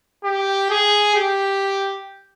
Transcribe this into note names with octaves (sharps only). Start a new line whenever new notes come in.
G4
G#4
G4